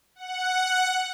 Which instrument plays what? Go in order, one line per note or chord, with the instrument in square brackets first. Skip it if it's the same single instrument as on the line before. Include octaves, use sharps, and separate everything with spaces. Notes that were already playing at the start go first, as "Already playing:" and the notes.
[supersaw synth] F#5